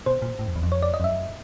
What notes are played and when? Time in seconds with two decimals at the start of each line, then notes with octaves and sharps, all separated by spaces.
0.06 B2 C5
0.22 A#2
0.39 A2
0.47 F2
0.56 E2
0.63 F2
0.72 C#5
0.83 D5
0.94 D#5
1.00 F2
1.04 F#2 E5